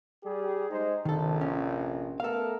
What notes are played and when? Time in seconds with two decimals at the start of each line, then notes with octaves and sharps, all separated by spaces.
0.24 G3 G4 G#4
0.70 G#3 D#4 C5
1.05 A#1 F2 C3 D#3 A4
1.41 C#4
2.20 A3 B3 A4 A#4 F5